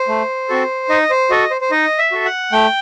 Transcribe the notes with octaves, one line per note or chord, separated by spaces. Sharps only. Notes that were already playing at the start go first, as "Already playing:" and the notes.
Already playing: C5
A3
C4 F#4 A4
D#4 D#5
C5
F#4 A4 D#5
C5
C5
D#4 D#5
E5
F#4 A4
F#5
A3 G5